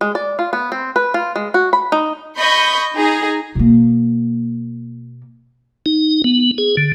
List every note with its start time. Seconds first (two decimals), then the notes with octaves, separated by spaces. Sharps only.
0.01 G#3
0.15 D5
0.39 F4
0.53 B3
0.72 C4
0.96 B4
1.14 F4
1.36 G#3
1.54 F#4
1.73 B5
1.92 D#4
2.37 D#5 B5 C#6 G6
2.96 D#4 G#4 A#5
3.55 B2 A#3
5.86 D#4
6.24 B3
6.58 G#4
6.77 D3